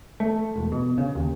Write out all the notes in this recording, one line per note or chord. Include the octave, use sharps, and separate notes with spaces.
A3
E1
B2
C#3
D#2